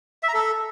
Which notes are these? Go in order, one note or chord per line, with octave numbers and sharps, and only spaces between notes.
E5
A#5
A4